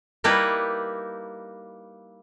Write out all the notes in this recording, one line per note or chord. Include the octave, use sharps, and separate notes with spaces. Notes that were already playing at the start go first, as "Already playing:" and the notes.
G3 A#3 D#4 E4 G4 B4